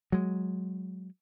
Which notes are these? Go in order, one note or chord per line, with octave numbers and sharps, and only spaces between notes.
F#3 G#3